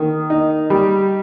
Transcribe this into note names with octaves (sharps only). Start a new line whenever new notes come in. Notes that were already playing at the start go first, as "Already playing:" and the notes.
Already playing: D#3
D#4
G3